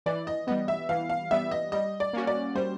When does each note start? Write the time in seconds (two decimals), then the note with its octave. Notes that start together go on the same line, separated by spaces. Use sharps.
0.06 E3 D5
0.27 D#5
0.47 G3 B3 D#5
0.68 E5
0.89 E3 F5
1.10 F5
1.31 G3 B3 E5
1.51 D#5
1.72 G3 D#5
2.00 D5
2.13 A#3 C#4 F#4
2.27 D5
2.55 G3 C5